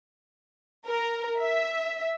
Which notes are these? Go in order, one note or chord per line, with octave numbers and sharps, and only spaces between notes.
A#4
E5